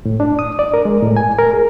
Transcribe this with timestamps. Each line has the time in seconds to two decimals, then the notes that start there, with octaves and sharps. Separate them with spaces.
0.05 A2
0.20 D4
0.39 D#6
0.59 D5
0.74 A#4
0.85 G#3
1.03 A2
1.17 G#5
1.38 A#4
1.53 G#4